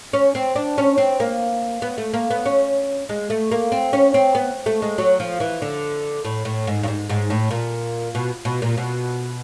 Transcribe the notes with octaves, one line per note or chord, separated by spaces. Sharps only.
C#4
C4
D4
C#4
C4
A#3
B3
A3
A#3
B3
C#4
G#3
A3
A#3
C4
C#4
C4
B3
A3
G#3
F#3
F3
E3
D3
A2
A2
G#2
G2
G#2
G#2
A2
A#2
B2
B2
A#2
B2